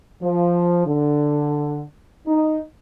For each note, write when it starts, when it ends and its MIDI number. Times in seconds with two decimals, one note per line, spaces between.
0.22 0.84 53
0.86 1.83 50
2.27 2.60 63